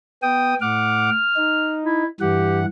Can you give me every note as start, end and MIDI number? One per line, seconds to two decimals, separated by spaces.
0.22 0.54 59
0.22 0.56 79
0.22 0.54 87
0.61 1.10 45
0.61 1.10 78
0.61 1.10 86
0.61 1.78 89
1.36 2.03 63
1.85 2.07 64
2.20 2.66 43
2.20 2.66 52
2.20 2.60 67
2.20 2.66 78